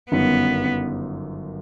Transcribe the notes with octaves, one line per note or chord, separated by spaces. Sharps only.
G1 F#2 D#3 F#3 B3